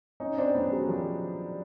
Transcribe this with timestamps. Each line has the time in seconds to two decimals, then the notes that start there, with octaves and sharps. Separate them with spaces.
0.20 C#4 D#4
0.38 C4 D4
0.55 B3 C#4
0.72 F#3 G#3
0.89 F3 G3